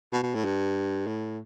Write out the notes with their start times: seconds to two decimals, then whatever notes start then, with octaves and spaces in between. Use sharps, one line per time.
0.12 B2
0.23 B2
0.34 A2
0.44 G2
1.07 A2